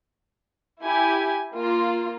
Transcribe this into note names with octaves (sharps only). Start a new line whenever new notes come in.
E4 G4 G#5
A#3 F4